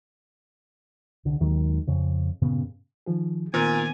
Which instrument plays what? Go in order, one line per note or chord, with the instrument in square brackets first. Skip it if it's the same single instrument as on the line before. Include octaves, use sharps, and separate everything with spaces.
[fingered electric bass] C2 D3
D#2 D#3 F#3 G#3
F2 C#3
G2 A#2 C#3 B3
[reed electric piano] D#3 F3 G#4
[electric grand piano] A#2 A#4 [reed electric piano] D#3 B3 C4 [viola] G#5